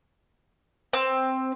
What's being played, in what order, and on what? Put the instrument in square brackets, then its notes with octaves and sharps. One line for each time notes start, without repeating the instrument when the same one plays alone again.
[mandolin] C4